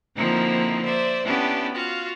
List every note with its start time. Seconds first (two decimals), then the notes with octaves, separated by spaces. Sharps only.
0.16 D3 F3 A#3 C4 D#4 E4
0.84 C5 D5 E5
1.23 B3 C#4 D4 E4 G4
1.73 F4 F#4 F5